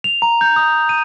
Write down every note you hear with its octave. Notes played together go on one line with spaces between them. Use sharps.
F7
A#5
G6
D#6
D#7